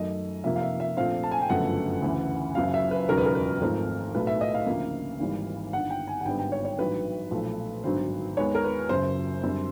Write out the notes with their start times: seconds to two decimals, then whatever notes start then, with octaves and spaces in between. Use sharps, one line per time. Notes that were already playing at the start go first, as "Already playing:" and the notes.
Already playing: F#2 D#3 F#3 A3 D#5
0.44 F1 F2 C3 F3 A#3 E5
0.56 F5
0.61 E5
0.80 E5
0.97 A#1 A#2 F3 A3 C4 F5
1.23 A5
1.31 G#5
1.41 G5
1.50 G1 F#2 C#3 F3 A3 F#5
2.02 D2 C#3 E3
2.55 F#1 F#2 C#3 F5
2.74 E5
2.91 B4
3.08 E1 D#2 C#3 F#3 A#4
3.17 B4
3.26 A#4
3.35 B4
3.61 G#1 G#2 F3 A3 C4 A#4
4.14 B1 A2 F#3 A3 B4
4.27 E5
4.41 D#5
4.54 F5
4.66 D2 C#3 F3 A#3
5.20 G#1 G#2 E3 G3 A#3
5.73 G1 G2 D#3 F#5
5.90 G5
6.07 G#5
6.21 F#5
6.25 G#1 G2 D3 G3 B3 G5
6.39 G5
6.52 C#5
6.65 C#5
6.78 A1 G2 D#3 F#3 B4
7.31 B1 A#2 F3 A3
7.84 G#1 G2 D3 F#3 B3 C5
8.37 D#2 D#3 G#3 B3 C#5
8.55 A#4
8.64 B4
8.89 F#1 F#2 C#3 C5
9.43 F#2 D3 G3 C4